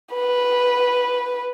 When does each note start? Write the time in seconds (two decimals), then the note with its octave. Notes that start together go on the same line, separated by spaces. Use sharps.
0.14 B4